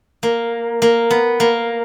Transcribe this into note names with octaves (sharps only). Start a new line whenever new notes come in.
A#3
A#3
B3
A#3